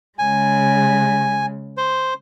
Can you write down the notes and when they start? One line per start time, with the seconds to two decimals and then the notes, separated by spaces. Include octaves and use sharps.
0.19 C#3 G#3 G#5
1.77 C5